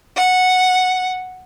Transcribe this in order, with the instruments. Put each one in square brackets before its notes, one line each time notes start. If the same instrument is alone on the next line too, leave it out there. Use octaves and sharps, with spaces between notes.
[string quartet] F#5